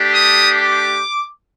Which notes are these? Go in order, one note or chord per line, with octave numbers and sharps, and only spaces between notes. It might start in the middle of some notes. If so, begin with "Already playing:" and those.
Already playing: A3 D4 G4
D#6
D6